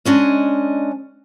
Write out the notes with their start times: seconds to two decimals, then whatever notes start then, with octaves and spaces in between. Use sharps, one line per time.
0.05 G#3 C#4 D4 D#5